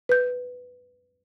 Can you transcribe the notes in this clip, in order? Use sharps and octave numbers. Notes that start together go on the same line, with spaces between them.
B4 G6